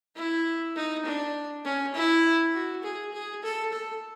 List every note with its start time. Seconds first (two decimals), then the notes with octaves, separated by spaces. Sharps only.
0.16 E4
0.76 D#4
1.05 D4
1.65 C#4
1.95 E4
2.54 F#4
2.83 G#4
3.13 G#4
3.43 A4
3.73 A4